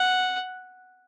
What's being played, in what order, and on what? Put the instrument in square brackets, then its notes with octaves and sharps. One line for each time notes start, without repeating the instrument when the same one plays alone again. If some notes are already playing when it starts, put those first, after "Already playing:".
Already playing: [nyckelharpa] F#5